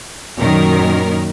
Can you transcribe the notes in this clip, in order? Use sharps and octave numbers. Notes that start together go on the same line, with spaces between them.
F#2 A#2 D#3 A#4